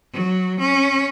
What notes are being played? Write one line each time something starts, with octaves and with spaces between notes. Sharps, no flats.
F#3
C#4